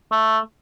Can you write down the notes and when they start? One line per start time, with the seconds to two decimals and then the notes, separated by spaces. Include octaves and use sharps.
0.12 A3